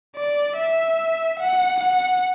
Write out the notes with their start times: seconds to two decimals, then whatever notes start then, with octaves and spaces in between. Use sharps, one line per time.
0.16 D5
0.57 E5
1.40 F#5
1.80 F#5